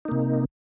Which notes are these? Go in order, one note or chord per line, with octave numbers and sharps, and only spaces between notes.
C3 A#3 D#4